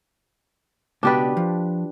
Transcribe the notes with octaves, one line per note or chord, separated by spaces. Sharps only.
C#2 B2 D4 G4 B4 D5
F3